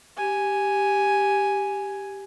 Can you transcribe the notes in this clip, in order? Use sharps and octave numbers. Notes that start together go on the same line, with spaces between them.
G4 G#5